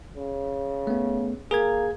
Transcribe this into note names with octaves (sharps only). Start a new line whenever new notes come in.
C#3
A3 B3
A#3 G#4 A#4 G#6